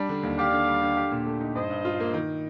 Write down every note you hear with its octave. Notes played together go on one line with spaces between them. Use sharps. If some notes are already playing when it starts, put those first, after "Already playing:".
Already playing: G3 D4
D3
D#2
G4 D5 F5
D3
G3
D3
G4
A#2
A3
D#4
G2 C5 D#5
G2
F4
A#3
D#3